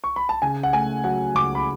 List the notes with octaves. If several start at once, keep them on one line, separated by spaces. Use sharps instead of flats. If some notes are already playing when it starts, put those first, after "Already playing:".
C#6
B5
A5
C#3 G#5
F#5
A3 G#5
F#3 F#5
C#2 D6
B5